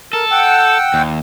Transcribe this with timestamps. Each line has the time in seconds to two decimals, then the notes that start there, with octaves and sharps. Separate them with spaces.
0.13 A4 A#4
0.31 F#5 G5 E6
0.94 D#2